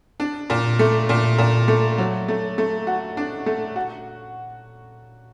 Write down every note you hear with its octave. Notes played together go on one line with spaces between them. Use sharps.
D4
A#2
A3
A#2
A#2
A3
F#3
A3
A3
F#4
D4
A3
F#4